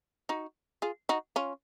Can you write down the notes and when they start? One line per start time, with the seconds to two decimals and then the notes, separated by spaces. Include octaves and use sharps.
0.29 D#4 F#4
0.82 F4 G#4
1.09 D#4 F#4
1.36 C#4 F4